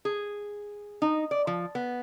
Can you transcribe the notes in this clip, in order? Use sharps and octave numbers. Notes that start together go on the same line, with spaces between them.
G#4
D#4
D5
F3
B3